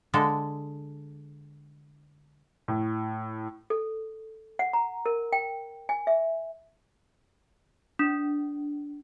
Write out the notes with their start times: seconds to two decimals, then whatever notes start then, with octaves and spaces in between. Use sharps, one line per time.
0.14 D3 G#3 A4
2.68 A2
3.70 A4
4.59 F#5
4.73 A#5
5.06 A#4
5.33 G5
5.89 G#5
6.07 E5
7.99 D4